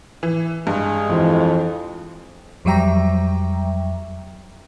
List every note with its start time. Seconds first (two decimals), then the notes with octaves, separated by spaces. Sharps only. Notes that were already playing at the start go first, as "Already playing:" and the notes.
0.23 E3
0.67 G2 G#3
1.10 F2 E3
2.65 F2 F#3 G3 E5 G5 A#5